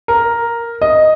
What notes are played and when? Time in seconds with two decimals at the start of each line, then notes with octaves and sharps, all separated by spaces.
0.08 A#4
0.82 D#5